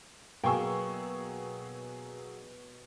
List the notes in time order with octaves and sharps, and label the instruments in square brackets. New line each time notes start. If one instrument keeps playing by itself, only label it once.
[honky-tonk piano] B2 C#6 [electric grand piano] F#3 G#4 E6 [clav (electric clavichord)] A#3 [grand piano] G5 G#5